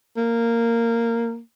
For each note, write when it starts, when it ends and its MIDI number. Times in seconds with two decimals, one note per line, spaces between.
0.16 1.39 58